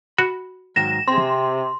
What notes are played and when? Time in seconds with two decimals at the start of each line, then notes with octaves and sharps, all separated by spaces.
0.18 F#4 B5
0.76 G#2 D#3 F#3 A#6 E7
1.08 C3 C4 G#4 C6